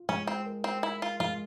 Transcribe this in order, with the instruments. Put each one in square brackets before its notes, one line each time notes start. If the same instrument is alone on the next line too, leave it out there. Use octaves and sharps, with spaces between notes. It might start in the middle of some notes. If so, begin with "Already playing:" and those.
Already playing: [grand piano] F4
[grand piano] G#3 [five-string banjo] C#4
[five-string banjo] C4
[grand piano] A#4
[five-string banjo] C4
[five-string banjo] E4 [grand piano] A#4
[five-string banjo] F4
[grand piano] G#3 [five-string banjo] F4